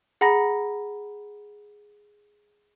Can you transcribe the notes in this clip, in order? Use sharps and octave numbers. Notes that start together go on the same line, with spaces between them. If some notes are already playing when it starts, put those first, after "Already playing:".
G#4 F#5 A#5 B5 A#6